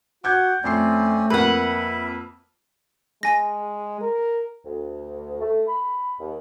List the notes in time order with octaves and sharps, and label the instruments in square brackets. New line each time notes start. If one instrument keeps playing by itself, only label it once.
[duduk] F#4 [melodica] F#5 [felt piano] D6 G6 G#6
[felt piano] F2 C6 C7 [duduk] A3 [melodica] C4 C#4 D5
[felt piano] F2 A#3 [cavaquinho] B4 F#5 [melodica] E5
[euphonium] G#3 [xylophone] G#5 A#6
[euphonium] A#4
[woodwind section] D2
A3
B5
D#2